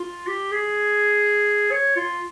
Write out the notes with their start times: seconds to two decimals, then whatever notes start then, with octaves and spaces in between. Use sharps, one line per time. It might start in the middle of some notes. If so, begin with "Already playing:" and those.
Already playing: F4
0.27 G4
0.52 G#4
1.71 C#5
1.96 F4